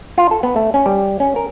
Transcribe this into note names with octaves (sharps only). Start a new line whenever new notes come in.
F4
A4
B3
A3
C#4
G3
C#4
A#4